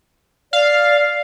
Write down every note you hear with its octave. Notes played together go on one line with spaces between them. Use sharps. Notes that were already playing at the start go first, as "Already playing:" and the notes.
D5 F5